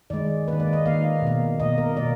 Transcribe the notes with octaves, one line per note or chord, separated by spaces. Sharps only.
D#3 G#3 D5
D#3 A#3 B4
D5
D#5
D#3 A#3 F5
B2 A#3
B2 A#3 D#5
A#4
B2 A#3 D5